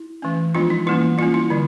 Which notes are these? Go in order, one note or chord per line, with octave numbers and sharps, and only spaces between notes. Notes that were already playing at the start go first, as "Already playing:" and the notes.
Already playing: E4
E3 A3 C#4
F3 G#3 B3 D4 F4
D#4
E3 G3 A#3 C#4 E4
G3 A#3 C#4 F4
E4
D3 G3